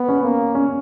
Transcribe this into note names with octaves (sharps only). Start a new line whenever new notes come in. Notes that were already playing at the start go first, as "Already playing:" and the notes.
Already playing: B3
C#4
A#3
C#4